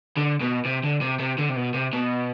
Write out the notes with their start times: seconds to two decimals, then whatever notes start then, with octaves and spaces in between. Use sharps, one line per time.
0.17 D3
0.41 B2
0.65 C3
0.84 D3
1.02 C3
1.19 C3
1.38 D3
1.49 C3
1.56 B2
1.74 C3
1.93 B2